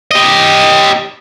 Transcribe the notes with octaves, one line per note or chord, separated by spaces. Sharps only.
G4 D#5